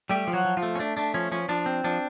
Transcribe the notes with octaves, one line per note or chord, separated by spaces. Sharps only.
G3 A3 G4
F3
F#3 F#4
F3
F3 F4
A3
C#4
A3 D4
A3 D4
F3 C#4
F3 C#4
F3 D4
C4
F3 D4